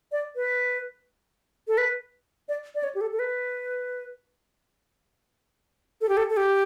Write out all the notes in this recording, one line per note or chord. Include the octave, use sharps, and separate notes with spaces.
D5
B4
A4
B4
D5
D5
C#5
G4
A4
A4
B4
A4
G4
A4
A4
G4